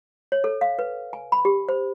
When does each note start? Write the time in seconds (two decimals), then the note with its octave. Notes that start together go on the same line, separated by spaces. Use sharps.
0.32 C#5
0.44 A4
0.61 F5
0.79 B4
1.13 G#5
1.32 B5
1.45 G4
1.69 C5